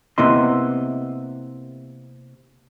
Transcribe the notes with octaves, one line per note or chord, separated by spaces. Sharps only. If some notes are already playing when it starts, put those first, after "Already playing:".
C3 A#3 B3 E4 D#5 C6